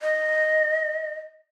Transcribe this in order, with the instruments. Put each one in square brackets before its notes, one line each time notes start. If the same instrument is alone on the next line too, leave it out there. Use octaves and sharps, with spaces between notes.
[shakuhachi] D#5